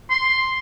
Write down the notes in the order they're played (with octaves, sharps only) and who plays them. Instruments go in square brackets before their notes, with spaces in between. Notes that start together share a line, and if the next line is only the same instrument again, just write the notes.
[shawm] C6